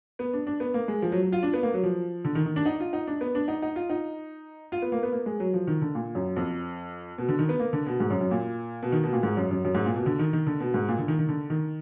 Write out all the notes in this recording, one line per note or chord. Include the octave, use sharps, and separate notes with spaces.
B3
D4
D4
B3
A#3
G#3
F3
F#3
F#3
F4
D4
B3
A#3
F#3
F3
D3
D#3
D#3
D4
D#4
F4
D#4
D4
B3
D4
D#4
D#4
F4
D#4
F4
B3
A#3
B3
A#3
G#3
F#3
F3
D#3
D3
A#2
F#2
F2
B2
D3
D#3
B3
A#3
D3
B2
G#2
F#2
F#2
A#2
B2
D#3
B2
A#2
G#2
F#2
F#2
F#2
G#2
A#2
B2
D3
D#3
D#3
D3
B2
G#2
A#2
D3
D#3
D#3
D3
D#3